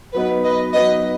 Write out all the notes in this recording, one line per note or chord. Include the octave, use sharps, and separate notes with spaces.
F#3 B3 D#4 B4
B4 D#5
F#3 B3 D#4 B4 D#5